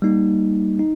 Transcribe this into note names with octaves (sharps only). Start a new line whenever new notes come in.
G3 A#3 D#4
D#4